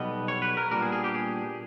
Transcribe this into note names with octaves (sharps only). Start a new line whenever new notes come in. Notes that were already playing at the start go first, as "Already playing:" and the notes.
Already playing: B1 B2 G3 B3 D#5
C#5
B4
A#4
A#2 G3 B3 D4 A#4
G#4
G#4
G4
G#4